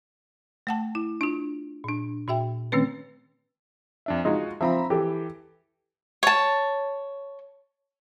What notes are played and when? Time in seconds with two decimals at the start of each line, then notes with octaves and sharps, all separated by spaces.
0.67 A3 F#5 A5
0.95 E4
1.21 D4 F4
1.84 A#2 D4
2.28 A#2 F#4 E5 G5
2.72 D#3 A3 C4 C#4 B4
4.06 F2 D4 E5
4.25 G#3 D#4 F4 F#4
4.61 F3 C4 E5 A#5 B5
4.90 E3 G4 A4
6.23 C#5 A5